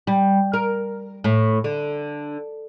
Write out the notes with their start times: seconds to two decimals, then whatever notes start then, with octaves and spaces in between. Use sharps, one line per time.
0.07 G3
0.53 A#4
1.24 A2
1.64 D3